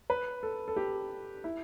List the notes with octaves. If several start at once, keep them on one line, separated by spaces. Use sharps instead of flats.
B4
A4
A4
G4
E4